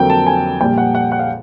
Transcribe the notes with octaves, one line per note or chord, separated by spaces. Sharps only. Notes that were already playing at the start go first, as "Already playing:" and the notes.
Already playing: F2 D3 F#3 A#3 G5
A5
G#5
A#1 A#2 G3 G5
F#5
F#5
F#5
F5